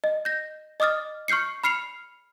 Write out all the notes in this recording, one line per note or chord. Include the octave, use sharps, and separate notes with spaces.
D#5
G6 A#6
D#5 D6 D#6 F6 A6
C#6 F6 G6 C7 C#7
B5 F6 C7 C#7 F7